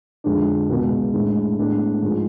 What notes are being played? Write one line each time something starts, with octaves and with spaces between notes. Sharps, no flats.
F2 D3 G#3 D4
C#2 B2 G#3 B3
A2 G#3 D4
A2 G#3 B3 D4
G#2 F3 G#3